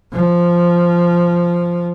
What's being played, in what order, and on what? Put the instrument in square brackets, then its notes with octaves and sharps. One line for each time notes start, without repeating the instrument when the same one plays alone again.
[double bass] F3